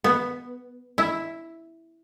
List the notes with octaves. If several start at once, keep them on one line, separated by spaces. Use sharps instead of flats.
B3
E4